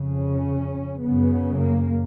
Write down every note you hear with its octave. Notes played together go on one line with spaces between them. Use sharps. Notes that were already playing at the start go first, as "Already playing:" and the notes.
Already playing: F2 C#3
C#4
F#2 C#3 B3
A#3